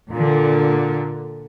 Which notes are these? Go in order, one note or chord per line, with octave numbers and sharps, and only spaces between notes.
A#2 D3